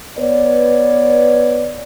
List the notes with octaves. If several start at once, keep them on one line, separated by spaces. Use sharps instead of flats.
B3 B4 C#5 D5